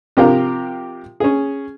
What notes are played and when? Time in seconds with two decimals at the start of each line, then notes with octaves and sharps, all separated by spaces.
0.17 C3 F3 G4 A#4 F5 G5
1.20 C#4 G#4